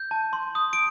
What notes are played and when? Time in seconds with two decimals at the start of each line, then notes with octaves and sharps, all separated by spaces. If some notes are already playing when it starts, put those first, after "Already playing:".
Already playing: G6
0.11 A5
0.33 C6
0.55 D#6
0.73 D7